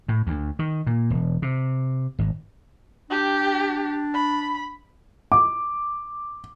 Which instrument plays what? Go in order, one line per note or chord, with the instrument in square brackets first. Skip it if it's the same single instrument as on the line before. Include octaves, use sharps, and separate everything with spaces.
[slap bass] A2
D2
D#3
A#2
E1
C3
G#1
[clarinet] D4 [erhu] G4
[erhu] B5
[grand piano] D6